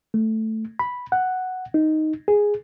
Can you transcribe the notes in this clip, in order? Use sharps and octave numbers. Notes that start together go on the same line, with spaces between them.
A3
B5
F#5
D#4
G#4